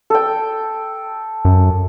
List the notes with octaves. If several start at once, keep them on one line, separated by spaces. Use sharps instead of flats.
A4 G5
F#2